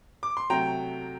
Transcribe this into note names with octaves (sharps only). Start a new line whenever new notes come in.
D6
C6
C3 F#3 A3 G5 A#5